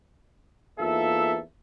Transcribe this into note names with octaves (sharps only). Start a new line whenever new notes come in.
E2 A#3 D#4 F4 A4 E5